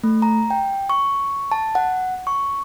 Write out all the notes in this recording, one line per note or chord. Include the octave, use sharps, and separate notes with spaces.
A3
A#5
G5
C#6
A5
F#5
C#6